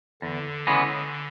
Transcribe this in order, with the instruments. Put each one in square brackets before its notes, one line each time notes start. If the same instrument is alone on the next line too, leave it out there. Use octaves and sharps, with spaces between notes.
[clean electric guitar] E2 [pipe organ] D3
[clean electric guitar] C#3 E3 G#3 B3